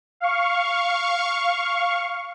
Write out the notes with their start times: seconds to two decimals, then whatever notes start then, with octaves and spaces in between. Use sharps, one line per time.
0.20 F5 C#6